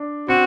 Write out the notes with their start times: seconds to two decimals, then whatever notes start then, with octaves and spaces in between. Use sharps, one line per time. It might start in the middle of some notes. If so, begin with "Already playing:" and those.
Already playing: D4
0.28 C4 F#4